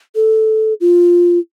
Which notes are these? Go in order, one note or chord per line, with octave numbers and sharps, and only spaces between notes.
A4
F4